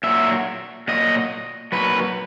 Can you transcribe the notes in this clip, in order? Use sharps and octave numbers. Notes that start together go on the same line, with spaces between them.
A#2 F#3 E5
A#2 F#3 D#5
A#2 F#3 B4